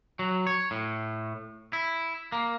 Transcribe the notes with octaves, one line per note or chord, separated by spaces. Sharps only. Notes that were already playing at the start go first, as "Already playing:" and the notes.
F#3
C#5
A2
E4
A#3